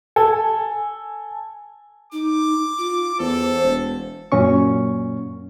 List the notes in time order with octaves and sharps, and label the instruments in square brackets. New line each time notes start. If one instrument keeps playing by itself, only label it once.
[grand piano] A4 [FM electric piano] G#5
[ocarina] D#4 [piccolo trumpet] D6
[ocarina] F4
[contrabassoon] E2 [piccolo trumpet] A4 [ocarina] C5
[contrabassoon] E1
[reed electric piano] F#2 A#2 C#4 C#6